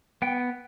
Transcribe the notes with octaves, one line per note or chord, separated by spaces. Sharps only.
B3 G5